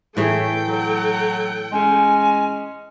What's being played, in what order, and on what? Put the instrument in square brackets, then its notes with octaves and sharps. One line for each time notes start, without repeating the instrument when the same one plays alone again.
[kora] A2 E3 G#4 [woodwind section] A3 C#5 [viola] A4 G5
[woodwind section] F#3
[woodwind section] G#3 C#4 [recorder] G#5